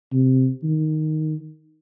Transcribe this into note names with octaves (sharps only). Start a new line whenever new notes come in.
C3
D#3